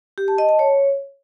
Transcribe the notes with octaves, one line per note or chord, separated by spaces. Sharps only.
G4
A5
D#5
A5
C#5